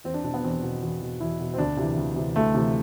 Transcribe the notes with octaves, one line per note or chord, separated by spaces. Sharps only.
E2 C4
D4
B2 D4
B3
E2 C4
B2
E2
B2
E2 E4
B2
C4
D2 D4
C3 E3
D2
C3 E3
D2 A3
C3 E3